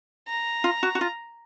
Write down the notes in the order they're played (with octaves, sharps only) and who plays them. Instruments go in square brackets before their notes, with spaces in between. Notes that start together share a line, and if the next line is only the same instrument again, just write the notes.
[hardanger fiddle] A#5
[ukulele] F4
F#4
F#4
F4